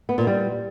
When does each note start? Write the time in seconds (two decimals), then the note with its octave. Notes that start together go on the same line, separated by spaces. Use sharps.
0.09 B3
0.18 A#2
0.27 G3